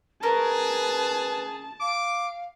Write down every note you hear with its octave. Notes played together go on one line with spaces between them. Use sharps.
C#4 G#4 A#4 B4 A5
F5 D6